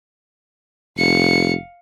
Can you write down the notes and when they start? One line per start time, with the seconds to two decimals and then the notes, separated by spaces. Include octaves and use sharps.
0.97 F1 F5 C#7